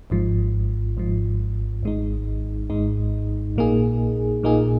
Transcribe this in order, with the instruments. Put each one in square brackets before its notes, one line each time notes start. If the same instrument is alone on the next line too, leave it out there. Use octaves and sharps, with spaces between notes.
[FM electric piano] G#1 G#2 F3
G#1 G#2 F3
G#1 G#2 G#3 D#4
G#1 G#2 G#3 D#4
A#1 A#2 A#3 D#4 G#4
A#1 A#2 A#3 D#4 G#4